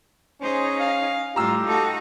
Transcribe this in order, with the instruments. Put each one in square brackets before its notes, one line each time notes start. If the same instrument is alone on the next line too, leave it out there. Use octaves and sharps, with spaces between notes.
[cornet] C#4 [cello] D#4 G#4 [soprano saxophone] C5
[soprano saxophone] F5
[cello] A2 G3 [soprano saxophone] F4 [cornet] G4 [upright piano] A#5 E6
[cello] D#4 F#4 [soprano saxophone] A4